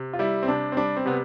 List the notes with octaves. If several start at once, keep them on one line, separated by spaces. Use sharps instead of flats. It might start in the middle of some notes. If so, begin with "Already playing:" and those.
Already playing: C3
F4
G3 E4
C4
C3 D4
C4
G3 D4
C4
C3 B3